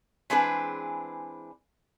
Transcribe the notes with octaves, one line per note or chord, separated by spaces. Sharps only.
E3 G#3 C4 D4 G#4 B4